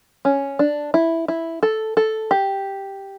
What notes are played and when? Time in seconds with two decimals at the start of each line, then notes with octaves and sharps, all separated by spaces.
0.25 C#4
0.59 D4
0.94 E4
1.28 E4
1.63 A4
1.97 A4
2.31 G4